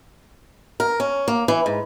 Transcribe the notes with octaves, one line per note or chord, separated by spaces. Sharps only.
A#4
C#4
A#3
E3
G#2